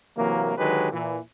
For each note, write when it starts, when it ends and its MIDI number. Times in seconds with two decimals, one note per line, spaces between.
0.17 0.52 48
0.17 0.52 52
0.17 0.52 54
0.17 0.52 58
0.57 0.91 50
0.57 0.91 51
0.57 0.91 54
0.57 0.91 56
0.57 0.91 67
0.57 0.91 71
0.92 1.18 46
0.92 1.18 52